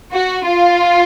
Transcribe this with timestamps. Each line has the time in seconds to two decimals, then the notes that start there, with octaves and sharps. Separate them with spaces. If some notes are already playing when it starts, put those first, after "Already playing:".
0.13 F#4
0.47 F4